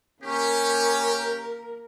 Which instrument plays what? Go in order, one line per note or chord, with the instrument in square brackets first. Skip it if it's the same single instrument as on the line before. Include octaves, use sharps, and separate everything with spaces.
[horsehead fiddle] A#3 A#4 [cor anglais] C#4 [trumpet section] G4